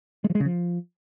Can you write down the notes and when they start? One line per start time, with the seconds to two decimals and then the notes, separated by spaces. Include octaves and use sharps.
0.24 G#3
0.30 F3
0.35 G#3
0.40 C#3
0.45 F3